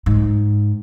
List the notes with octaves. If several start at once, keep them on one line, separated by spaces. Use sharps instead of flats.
G#2